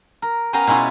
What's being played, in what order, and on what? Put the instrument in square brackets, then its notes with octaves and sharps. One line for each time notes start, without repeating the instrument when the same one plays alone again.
[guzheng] A#4
B3 C#4 A#4 F5 G5 A#5
B2 G#3 C#4 E4 F4